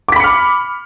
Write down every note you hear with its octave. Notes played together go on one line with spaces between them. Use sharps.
B5 D6 F6 B6 C#7